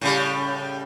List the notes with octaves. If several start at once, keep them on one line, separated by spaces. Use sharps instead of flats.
A2 C#3 G3